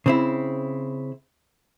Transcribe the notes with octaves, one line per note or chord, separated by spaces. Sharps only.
C#3 C4 E4